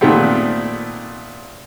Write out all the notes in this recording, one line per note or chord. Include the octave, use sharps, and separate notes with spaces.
A#2 D#3 A3 B3 C4